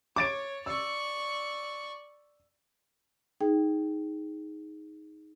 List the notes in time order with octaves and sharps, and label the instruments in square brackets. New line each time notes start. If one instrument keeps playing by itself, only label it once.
[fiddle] C#5 [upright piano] D6 A6 D7
[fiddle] D5 C#6 [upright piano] E6
[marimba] D#4 G#4 G5